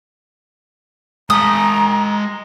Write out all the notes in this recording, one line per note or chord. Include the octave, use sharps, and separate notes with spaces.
G#3 A5 A#5 D#6